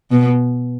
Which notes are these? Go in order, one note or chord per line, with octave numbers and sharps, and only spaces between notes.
B2